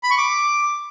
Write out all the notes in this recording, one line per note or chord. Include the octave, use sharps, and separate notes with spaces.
B5
C#6
D6